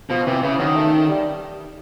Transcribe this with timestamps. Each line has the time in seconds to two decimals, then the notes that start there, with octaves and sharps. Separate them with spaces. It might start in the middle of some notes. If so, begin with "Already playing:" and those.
0.10 B2 F3
0.26 C3 E3
0.43 C#3 E3
0.60 D#3 F#3
0.76 A3
1.09 G3